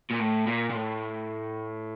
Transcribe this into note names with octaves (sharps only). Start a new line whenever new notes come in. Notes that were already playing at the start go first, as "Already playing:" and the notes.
A#2
A2
A#2
A#2
A2